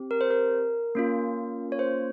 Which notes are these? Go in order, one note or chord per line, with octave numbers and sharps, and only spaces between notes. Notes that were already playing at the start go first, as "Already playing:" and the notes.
Already playing: C4 G4
A#4
C5
A#4
A#3 C#4 F4
C#5
C5